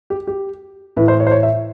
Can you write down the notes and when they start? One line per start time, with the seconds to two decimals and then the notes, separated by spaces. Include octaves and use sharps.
0.10 G4
0.27 G4
0.96 A2 E3 B4
1.08 C5
1.20 C#5
1.27 C5
1.31 C#5
1.43 E5